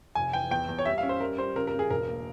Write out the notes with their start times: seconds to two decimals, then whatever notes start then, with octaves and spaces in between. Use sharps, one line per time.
0.15 F1 G#5
0.33 E3 G5
0.51 E2 G5
0.68 E2
0.79 C#5
0.86 G3 E5
0.98 F5
1.03 C#4
1.09 C5
1.20 G3 A#4
1.38 G3 C5
1.56 C#3 A#4
1.67 A#4
1.74 C#3
1.79 G#4
1.90 E1 A#4
2.08 A#3